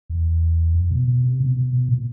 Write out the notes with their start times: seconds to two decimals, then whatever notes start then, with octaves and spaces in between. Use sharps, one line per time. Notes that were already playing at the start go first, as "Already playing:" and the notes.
0.10 E2
0.75 F2
0.91 B2
1.08 B2
1.24 C3
1.40 B2
1.56 B2
1.73 B2
1.89 A#2